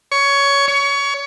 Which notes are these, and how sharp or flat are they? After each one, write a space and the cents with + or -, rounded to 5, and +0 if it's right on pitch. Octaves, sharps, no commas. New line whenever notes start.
C#5 +15
C#5 +25